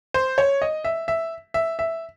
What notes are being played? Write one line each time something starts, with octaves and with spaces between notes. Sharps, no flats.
C5
C#5
D#5
E5
E5
E5
E5